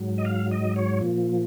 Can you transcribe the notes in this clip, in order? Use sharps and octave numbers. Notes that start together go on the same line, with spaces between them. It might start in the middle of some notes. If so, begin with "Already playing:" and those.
Already playing: G#2 F#3
D#5
F5
D#5
C#5
A#2 F3